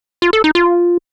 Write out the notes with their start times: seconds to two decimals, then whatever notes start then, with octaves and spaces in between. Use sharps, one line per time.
0.22 F4
0.33 A4
0.44 D#4
0.55 F4